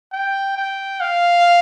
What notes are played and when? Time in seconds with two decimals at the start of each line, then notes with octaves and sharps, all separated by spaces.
0.12 G5
0.57 G5
1.01 F5